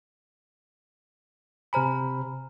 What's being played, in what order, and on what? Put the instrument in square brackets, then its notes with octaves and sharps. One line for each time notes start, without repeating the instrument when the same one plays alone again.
[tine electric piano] C3 C5 B5 [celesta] G#5 A#5 F6